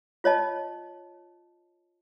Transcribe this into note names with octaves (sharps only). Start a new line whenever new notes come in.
F4 C#5 D#5 A5